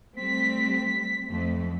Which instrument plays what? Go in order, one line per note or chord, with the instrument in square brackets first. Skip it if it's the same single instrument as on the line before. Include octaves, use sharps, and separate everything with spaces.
[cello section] G3 A3 C4 [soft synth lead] B6
[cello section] F2 A3